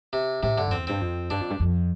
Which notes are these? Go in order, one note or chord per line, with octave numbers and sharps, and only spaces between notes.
C3
A2 C3
G2 D3
F2
E2 C4
G2 C4
F2
G2 D4
F2
G2
F2